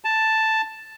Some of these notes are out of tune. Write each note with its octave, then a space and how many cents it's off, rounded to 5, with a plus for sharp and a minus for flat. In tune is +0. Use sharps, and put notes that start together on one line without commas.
A5 +5